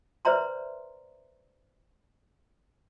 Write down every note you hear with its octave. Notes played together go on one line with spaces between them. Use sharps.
B4 C5 D5 E5 A#5 C6